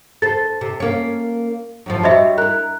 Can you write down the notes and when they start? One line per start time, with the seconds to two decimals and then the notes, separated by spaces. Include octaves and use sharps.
0.22 A4 C5 A6
0.61 C3
0.80 A#3 C#4
1.86 F#2 A2 F3
2.03 G3 F#4 C#5 D#5 E5
2.38 E4 A#4 F#6